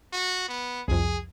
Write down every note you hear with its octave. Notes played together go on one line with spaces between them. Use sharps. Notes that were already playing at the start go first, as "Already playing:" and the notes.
F#4
B3
C2 F2 G#4